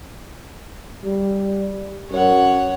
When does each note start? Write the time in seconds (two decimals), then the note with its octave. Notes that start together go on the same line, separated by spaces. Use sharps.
1.04 G3
2.11 F#2 C#5 F#5